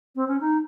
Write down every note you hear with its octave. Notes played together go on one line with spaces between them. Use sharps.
C4
C#4
D#4